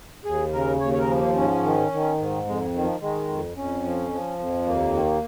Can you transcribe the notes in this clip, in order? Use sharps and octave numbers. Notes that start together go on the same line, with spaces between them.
D#2 G#4
C#3 A#4
D#2 C#5
C#5
A#4
F3
A#3
G#2 C#4
D#3
D#3
G#2
F2 G#3
D#3
F3
D#3 G#3
F2
F2 C#4
F3
F3
F2
D#2 A#3
D#3